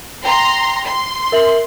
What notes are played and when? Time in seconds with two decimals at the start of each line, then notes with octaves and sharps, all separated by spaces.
0.25 G5 A#5 C6
0.86 C6
1.32 A#4 E5 F#7